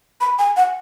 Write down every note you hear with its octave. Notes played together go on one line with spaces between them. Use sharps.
B5
G#5
F#5